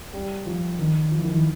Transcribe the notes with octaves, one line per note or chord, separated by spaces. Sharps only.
G3
F3
D#3
F3
E3
D#3
E3